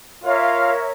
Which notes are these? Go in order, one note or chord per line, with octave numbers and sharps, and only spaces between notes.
F4 A#4 C#5 E5 F5